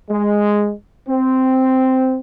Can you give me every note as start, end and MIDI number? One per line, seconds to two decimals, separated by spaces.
0.10 0.71 56
1.08 2.19 60